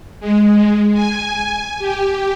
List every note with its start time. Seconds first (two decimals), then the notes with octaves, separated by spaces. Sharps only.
0.20 G#3
0.94 G#5
1.79 G4